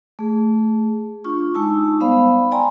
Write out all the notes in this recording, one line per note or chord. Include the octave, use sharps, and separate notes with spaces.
A3 G#4
D4 F4 C#6
G#3 D#4 A5 E6
G3 B3 C5 D5 F5 B5
D5 G5 G#5 A#5 C6